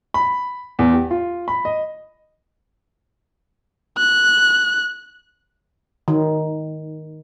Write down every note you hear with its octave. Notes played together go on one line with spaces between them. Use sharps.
B5
E2
G4
F4
B5
D#5
F#6
D#3